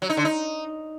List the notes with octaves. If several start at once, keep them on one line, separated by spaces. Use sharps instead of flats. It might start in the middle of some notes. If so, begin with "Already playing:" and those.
F#3
D#4
D3
D#4